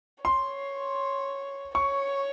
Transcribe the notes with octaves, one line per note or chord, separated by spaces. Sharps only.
C#5 C6
C#5 C#6